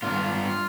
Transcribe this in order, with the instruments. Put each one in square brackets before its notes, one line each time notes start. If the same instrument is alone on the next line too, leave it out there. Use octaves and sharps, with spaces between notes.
[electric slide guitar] G2 F4